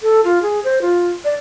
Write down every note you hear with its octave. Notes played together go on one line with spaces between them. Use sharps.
A4
F4
G#4
C5
F4
D5